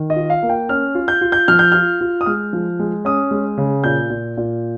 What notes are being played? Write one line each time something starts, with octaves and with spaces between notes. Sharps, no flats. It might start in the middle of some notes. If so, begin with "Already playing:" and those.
Already playing: D#3
D#5
F4
F5
A#3
G5
C#4 F6
F4
G6
F4
G6
F3 F6
G6
F4 F6
F4
D#6
G#3 F6
F3
G#3
C#4 D#6
G#3
C#3
A#2 G6
A#2
A#2